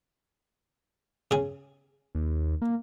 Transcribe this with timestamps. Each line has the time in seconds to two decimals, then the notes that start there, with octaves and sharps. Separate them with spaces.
1.31 C#3 G#4
2.15 D#2
2.62 A#3